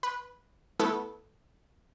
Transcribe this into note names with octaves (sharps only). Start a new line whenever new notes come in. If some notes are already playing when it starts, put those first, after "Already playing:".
B4
A3 B3 E4 A4